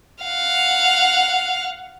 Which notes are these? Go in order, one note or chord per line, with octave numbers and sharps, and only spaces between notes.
F5 F#5